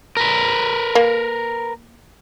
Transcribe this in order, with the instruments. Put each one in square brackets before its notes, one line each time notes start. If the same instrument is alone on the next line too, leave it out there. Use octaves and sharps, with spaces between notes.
[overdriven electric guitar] A#4 B4
[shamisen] A#3